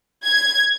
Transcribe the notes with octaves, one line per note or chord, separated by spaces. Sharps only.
G#6